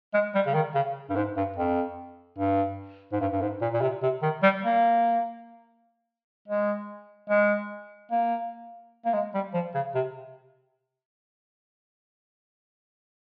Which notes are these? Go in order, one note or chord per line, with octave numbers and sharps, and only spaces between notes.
G#3
G3
C#3
D#3
C#3
G2
G#2
G2
F2
G2
G#2
G2
G2
G#2
A#2
A#2
C3
C3
D#3
G3
A#3
G#3
G#3
A#3
A#3
G#3
G3
F3
C#3
C3